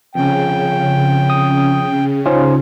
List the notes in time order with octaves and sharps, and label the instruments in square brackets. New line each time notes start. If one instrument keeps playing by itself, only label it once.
[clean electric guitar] F2 C#4 [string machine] C#3 [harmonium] G5
[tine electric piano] D#6
[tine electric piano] C#4 D#4 F4 [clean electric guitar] C5